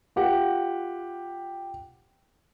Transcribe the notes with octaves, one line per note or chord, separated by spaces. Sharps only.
F4 G4 F#5